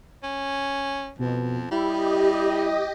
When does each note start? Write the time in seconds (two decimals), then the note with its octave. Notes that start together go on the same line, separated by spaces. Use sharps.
0.23 C#4
1.19 F2 B2
1.71 G3 E4 G4 D#5